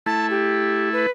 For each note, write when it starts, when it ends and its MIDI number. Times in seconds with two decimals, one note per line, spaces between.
0.06 1.06 57
0.06 1.06 64
0.06 0.27 81
0.30 0.89 67
0.93 1.10 71